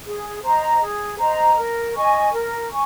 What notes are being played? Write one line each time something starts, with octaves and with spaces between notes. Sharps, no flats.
G#4
C5 D#5 A#5
G#4
C5 D#5 A#5
A#4
D#5 G#5 C#6
A#4
G#5 C#6